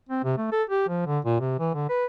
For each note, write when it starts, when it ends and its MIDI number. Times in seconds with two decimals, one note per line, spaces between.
0.09 0.23 60
0.24 0.36 48
0.37 0.50 57
0.52 0.63 69
0.70 0.86 67
0.88 1.03 53
1.06 1.19 50
1.25 1.36 46
1.40 1.55 48
1.59 1.70 52
1.74 1.89 50
1.89 2.06 71